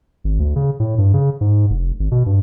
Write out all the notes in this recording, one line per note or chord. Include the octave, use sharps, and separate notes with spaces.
G#1
D2
C#3
A2
G2
C#3
G#2
F1
G#1
B2
G2